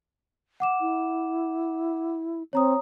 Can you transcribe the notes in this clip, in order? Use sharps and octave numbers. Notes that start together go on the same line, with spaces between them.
F#5 D6 E7
E4
C4 C#5 A#5 D#6